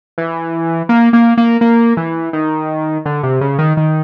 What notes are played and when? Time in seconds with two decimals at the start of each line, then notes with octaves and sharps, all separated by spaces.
0.18 E3
0.89 A#3
1.13 A#3
1.37 A#3
1.61 A#3
1.97 E3
2.33 D#3
3.05 D3
3.23 C3
3.41 C#3
3.59 D#3
3.77 D#3